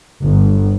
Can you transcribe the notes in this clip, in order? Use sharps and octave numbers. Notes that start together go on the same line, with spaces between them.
G1